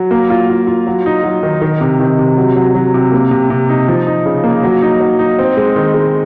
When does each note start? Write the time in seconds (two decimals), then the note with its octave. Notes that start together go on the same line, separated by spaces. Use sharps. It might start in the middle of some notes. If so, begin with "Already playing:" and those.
Already playing: F#3
0.11 A#3
0.30 F4
0.50 F4
0.67 F4
0.87 F#3
1.06 D#4
1.24 F#3
1.43 D#3
1.61 D#3
1.81 C3
2.00 D#3
2.19 C3
2.37 F#3
2.56 F#3
2.75 F#3
2.94 C3
3.12 A#3
3.31 C3
3.50 C3
3.69 D#4
3.88 F3
4.07 D#4
4.26 C#3
4.44 A#3
4.63 F#3
4.82 D#4
5.00 F#3
5.19 D#4
5.39 C4
5.57 G#3
5.76 D#3
5.94 G#3